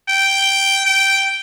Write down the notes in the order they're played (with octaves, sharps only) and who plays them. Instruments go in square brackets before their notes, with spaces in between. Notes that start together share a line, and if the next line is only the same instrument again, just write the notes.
[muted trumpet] G5
G5